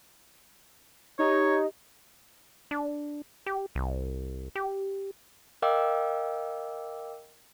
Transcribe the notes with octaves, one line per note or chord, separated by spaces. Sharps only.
D#4 G4 C#5
D4
G4
C2
G4
A#4 D#5 F5 G5 D6 E6